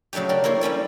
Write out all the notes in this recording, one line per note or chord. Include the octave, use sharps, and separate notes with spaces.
C#3 F#3 A3 D4 G4
G4 A#4 D5
A#3 E4 C5 C#5
G3 C#4 E4 D5